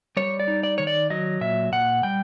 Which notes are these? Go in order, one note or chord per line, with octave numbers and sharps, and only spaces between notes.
G3 C#5
D5
D#4
D5
D#3 C#5
D5
F#3 D#5
A#2 E5
A#2 F#5
G3 G5